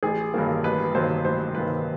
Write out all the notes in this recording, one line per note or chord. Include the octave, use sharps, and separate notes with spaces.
A1 G#4
G2 D#3 F#3 A#3
A1 B4
G2 D#3 F#3 A#3 C5
A1 C5
G2 D#3 F#3 A#3 B4